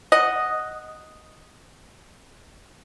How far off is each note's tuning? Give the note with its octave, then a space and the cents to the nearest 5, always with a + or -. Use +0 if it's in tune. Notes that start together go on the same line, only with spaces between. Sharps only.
D#5 +0 F#5 +0